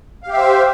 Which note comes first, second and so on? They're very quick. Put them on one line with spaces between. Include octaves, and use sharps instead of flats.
F5 G4 E5 C5